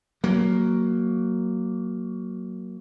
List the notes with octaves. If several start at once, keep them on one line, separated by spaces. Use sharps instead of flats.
F#3 A#3